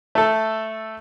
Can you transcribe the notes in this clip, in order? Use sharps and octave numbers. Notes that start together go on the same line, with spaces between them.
A3 A4